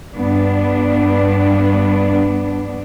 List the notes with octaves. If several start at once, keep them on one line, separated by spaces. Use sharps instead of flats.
G2 B3 D4